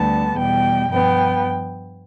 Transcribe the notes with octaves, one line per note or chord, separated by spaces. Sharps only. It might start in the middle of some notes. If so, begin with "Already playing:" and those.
Already playing: D2 D3 G3 B3 A5
E2 B2 G3 G5
G2 F3 B3 G5